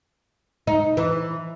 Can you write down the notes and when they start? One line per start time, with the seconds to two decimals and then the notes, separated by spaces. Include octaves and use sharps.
0.67 D#4
0.97 E3